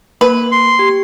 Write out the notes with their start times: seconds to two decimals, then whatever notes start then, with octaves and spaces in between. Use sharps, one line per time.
0.21 A#3 B4
0.52 C6
0.79 G4